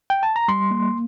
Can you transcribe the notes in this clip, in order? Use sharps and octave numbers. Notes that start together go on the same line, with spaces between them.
G5
A5
A#5
G3 C6
A#3